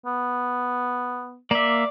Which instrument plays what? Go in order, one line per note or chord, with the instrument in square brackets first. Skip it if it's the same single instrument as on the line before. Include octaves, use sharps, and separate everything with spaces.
[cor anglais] B3
[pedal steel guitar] A#3 E5 [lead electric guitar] D5